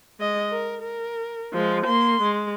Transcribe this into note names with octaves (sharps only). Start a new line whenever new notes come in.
G#3 D#5
A#4
A#4
F3 G#3
A#3 C6
G#3